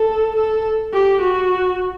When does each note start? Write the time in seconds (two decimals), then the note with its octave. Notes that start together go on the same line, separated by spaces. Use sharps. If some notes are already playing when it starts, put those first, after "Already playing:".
Already playing: A4
0.36 A4
0.93 G4
1.22 F#4